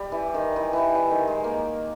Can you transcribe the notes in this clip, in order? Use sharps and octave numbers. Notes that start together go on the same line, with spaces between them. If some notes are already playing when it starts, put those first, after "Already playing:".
Already playing: G3
E3
D#3
E3
E3 G3
E3
D#3
G#3
A#3